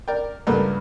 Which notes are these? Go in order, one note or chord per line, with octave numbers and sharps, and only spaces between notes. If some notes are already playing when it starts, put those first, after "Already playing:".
A#4 D5 G5
C#2 G2 A3 B3 A#4